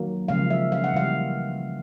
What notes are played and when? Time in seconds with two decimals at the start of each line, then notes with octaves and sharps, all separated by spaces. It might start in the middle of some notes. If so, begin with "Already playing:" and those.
Already playing: D#3 F#3 A#3
0.28 C#3 F3 G#3 F5
0.50 E5
0.72 F5
0.84 F#5
0.94 C#3 E3 G3 A#3 F5